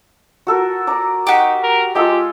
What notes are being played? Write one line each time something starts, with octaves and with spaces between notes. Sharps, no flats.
F#4 A4 A#4
D5 A#5
D#4 F#4 G4
A#4
G#3 F4 G4 A4